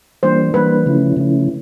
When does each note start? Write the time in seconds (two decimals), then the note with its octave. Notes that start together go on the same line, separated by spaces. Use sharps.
0.23 E3 G3 A#3 D4 C5
0.54 E3 G3 A#3 D4 B4
0.86 C#3 F3 A3 C#4 E4
1.17 C#3 F3 A3 C#4 E4